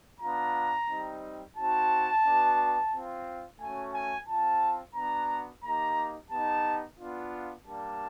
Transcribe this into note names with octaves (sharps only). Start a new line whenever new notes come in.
B3 D4 F4 A#5
G3 C4 D#4
C4 D#4 F#4 A5
B3 D4 F#4
C4 F4
A3 C#4 F#4 G#5
G#5
C4 F4 A5
B3 D4 F#4 A#5
A#3 D#4 G4 A#5
B3 D#4 G4 A5
B3 D4 F4
G3 A#3 D4 A5